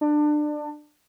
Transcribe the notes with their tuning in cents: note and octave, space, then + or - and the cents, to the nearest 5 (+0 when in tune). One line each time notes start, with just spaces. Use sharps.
D4 +25